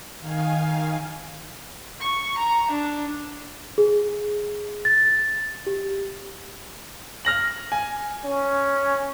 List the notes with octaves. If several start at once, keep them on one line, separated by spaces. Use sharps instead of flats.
D#3 F5 G#5
C#6
A#5
D4
G#4
A6
G4
F6 A#6 F#7
G#5
C#4